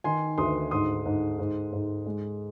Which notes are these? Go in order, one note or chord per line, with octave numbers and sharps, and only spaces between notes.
D#3 G#5 C6
D2 C6 D#6
G#2 C6 D#6
G#2
G#2
G#2
G#3